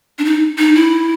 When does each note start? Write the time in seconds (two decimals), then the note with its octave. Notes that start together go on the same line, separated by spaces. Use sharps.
0.19 D4
0.25 D#4
0.58 D#4
0.75 E4